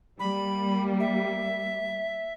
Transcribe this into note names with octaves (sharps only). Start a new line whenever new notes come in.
G3 A#3 B5
E5